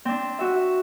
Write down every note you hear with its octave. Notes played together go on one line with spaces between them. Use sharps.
C4 D4
F#4 E5